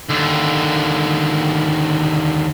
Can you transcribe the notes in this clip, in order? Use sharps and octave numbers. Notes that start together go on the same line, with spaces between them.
D#2 D3